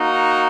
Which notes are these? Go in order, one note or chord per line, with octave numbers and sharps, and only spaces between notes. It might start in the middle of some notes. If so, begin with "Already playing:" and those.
Already playing: A#3 D#4 F#4